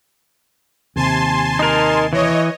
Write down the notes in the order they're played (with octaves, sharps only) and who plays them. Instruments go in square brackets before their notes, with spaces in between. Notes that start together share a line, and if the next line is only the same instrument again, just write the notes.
[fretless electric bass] D#2 C3 [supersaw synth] G#5 A5 C6
[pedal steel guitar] D#4 A#4
[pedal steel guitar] E3 [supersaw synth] C#5 D#5